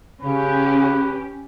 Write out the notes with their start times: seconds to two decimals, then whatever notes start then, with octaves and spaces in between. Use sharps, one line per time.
0.22 C#3 C#4 G4 B4